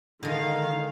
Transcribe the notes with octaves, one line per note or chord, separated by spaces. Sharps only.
D3 D#3 G#3 F5